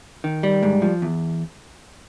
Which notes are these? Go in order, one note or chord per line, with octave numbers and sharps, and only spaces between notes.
D#3
G3
G#2
F3
E2